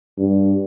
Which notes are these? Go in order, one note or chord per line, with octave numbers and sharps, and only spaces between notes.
G2